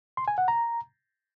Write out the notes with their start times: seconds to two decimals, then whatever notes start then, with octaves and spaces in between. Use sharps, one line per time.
0.17 C6
0.28 G#5
0.38 F#5
0.48 A#5